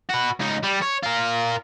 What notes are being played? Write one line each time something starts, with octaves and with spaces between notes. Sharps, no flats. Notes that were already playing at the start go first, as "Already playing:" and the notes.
F#4 B4
C#2 D#4
G3
C#5
F4 A#4